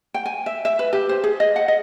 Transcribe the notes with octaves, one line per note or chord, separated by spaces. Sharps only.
G5
G#5
E5
E5
B4
G4
C5
G#4
D#5
F#5
D#5